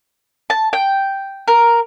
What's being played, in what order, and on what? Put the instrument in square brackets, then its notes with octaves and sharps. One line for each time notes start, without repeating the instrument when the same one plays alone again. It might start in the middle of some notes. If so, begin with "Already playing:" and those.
[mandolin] A5
G5
A#4